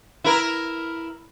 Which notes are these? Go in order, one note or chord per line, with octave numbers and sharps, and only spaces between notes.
E4 A#4